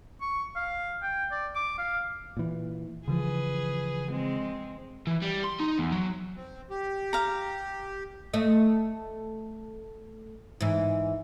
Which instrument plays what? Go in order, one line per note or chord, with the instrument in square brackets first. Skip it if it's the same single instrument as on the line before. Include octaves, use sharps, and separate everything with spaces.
[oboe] C#6
F5
G5
D5
D6
F5
[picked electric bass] A#2 E3
[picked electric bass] C#3 E3 F3 [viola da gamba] G#4 B4
[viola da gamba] G#3 C4
[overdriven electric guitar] E3
G3
C6
D#4
E2
F#3
[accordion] C4
G4
[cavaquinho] F5 A#5
[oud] A3 D#5
G#2 E3